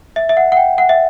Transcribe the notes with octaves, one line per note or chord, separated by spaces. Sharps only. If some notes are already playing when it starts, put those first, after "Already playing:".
E5
E5
F#5
F#5
G5
F#5
E5